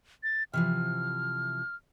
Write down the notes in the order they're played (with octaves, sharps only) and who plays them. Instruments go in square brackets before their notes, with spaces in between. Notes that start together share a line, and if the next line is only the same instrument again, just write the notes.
[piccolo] A6
[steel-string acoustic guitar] C3 E3 F3 [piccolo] F6